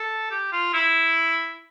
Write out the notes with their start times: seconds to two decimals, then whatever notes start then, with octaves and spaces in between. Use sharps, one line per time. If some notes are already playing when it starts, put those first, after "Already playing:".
Already playing: A4
0.31 G4
0.53 F4
0.73 E4